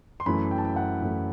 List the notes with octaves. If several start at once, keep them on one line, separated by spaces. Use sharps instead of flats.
C6
F#2 E3 A3 B5
G5
A5
G5
F#5
F#2 E3 A3